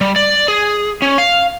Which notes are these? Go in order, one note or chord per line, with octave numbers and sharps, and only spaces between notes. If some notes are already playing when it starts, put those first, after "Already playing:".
G3
D5
G#4
C#4
F5